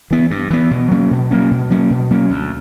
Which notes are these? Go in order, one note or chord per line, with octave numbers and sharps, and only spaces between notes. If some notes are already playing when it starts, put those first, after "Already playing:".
E3 B3
G2
E3 B3
B2
F#3 A#3 C#4
B2
F#3 A#3 C#4
B2
F#3 A#3 C#4
B2
F#3 A#3 C#4
D2